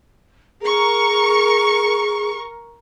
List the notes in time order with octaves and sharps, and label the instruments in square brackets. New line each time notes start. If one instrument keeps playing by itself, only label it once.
[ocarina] G#4 [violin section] A#4 C#6